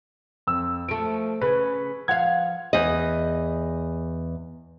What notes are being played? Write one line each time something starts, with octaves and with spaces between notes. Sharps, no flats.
F2 E6
F3 A3 D7
C#3 B4
F3 F5 F#5 G#6
E2 D#5